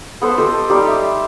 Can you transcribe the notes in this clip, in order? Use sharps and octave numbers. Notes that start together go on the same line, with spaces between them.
B3 A4 C5
G4 A4 C5 D#5
G3 D#4 G4
E5